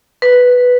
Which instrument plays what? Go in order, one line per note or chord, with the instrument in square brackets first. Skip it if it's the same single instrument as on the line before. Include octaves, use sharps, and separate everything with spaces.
[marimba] B4